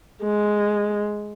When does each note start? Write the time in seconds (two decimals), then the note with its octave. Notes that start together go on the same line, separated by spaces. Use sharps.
0.23 G#3